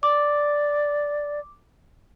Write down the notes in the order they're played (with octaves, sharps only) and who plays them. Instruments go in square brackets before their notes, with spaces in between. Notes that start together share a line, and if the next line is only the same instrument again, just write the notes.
[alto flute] D5 [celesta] D6